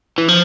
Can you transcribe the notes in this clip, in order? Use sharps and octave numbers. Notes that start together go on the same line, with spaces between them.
E3
F3